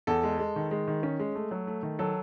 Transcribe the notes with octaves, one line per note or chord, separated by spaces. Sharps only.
E2 A4
G#3
G#3
D#3
G#3
D#3
C#4
G#3
A3
F#3
A3
D#3
F#3 A4